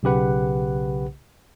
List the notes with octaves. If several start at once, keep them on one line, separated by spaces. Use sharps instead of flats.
B1 C#3 G4 B4 F#5